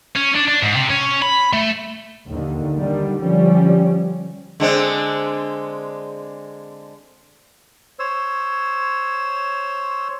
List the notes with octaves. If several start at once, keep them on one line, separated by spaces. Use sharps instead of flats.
C#4
D4
D4
G#2
C3
C#4
B5
A3
D#2 D3 D#3
D3 D#3 G3
D3 F3 G3 C#4
D3 G#3 C4
C5 C#5 E6